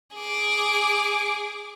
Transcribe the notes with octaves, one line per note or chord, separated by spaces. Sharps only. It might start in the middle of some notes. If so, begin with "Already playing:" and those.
G#4 D6